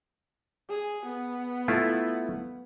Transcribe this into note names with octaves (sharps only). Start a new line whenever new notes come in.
G#4
B3
A3 E4 F4